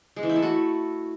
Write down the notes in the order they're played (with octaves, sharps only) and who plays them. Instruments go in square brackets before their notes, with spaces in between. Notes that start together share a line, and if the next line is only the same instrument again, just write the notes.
[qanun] G#3
E3
E4
A3
F#4